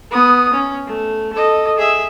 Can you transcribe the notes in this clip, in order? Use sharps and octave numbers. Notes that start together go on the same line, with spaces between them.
B3 D#6
C#4
A3
A4 D#5
G#4 E5